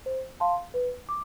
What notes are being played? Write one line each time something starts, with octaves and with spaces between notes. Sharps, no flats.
C5
F5 A5 C6
B4
D6